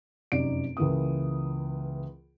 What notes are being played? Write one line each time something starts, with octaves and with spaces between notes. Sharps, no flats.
F1 F#2 D#4 D5 D7
C#2 E3 A#3 D#6